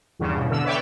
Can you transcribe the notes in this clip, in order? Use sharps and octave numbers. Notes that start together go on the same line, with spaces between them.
E2 G2 C#3
B2
D3 E6
B4 C#5 D5 E5 G5